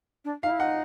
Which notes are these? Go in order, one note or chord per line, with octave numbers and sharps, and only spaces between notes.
D4
D#4 F5
E4
D#4 F#5